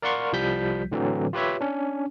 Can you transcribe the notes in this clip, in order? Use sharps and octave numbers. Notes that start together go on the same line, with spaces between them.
A#4 D5 F5 F#5 C6 C#6
C2 F3 G3 G6 B6
A2 D3 E3 F#3 C4
F4 G4 B4 C#5 E5
C#4 D4